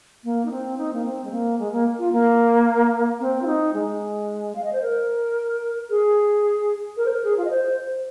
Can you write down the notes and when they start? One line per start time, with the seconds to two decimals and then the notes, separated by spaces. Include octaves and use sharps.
0.24 A#3
0.45 D#4
0.51 C4
0.78 D#4
0.93 A#3
1.05 C4
1.24 G#3
1.31 A#3
1.59 G#3
1.72 A#3
1.99 F4
2.12 A#3
3.20 C4
3.42 F4
3.46 D#4
3.74 G#3
4.56 F5
4.64 D#5
4.73 C5
4.82 A#4
5.90 G#4
6.97 A#4
7.06 C5
7.10 A#4
7.24 G#4
7.37 F4
7.45 D#5
7.50 C5